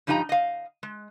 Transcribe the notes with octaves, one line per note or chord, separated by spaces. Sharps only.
G2 F3 D#4 G4 G#5 A#5
D#5 F5
G#3